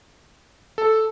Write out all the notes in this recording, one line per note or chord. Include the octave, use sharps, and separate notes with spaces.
A4